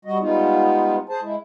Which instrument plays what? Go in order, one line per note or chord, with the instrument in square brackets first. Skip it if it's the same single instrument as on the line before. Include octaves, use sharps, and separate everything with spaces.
[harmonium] G3 F#4 D#5
G3 G#3 B3 D#4 F4
G#4 C5 A5
G#3 E4